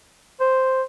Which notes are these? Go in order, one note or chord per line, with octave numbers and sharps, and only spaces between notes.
C5